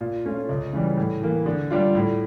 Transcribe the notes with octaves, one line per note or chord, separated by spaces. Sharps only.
A#2
A3 C#4 F4
C#2
C#3 E3 G3
A2
E3 A#3
D3
G3 D4 F4
A2